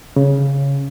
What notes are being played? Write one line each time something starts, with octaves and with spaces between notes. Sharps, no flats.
C#3